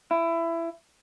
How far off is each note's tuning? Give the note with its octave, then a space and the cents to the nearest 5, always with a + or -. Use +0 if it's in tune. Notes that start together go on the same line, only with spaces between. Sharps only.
E4 +20